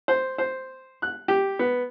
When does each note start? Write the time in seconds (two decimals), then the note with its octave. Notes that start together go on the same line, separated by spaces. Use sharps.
0.08 C5
0.38 C5
1.02 F#6
1.28 G4
1.59 B3